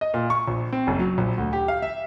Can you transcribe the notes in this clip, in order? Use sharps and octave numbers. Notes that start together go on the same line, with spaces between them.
D#5
A#2
C#6
A#1
C4
F#1
F#3
A#1
D2
G4
F5
E5